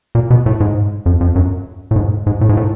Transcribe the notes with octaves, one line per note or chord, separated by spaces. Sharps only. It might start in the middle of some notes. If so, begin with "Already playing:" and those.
A#2
B2
A2
G#2
F2
F2
F#2
A2
G#2
G#2
A2
G#2
A2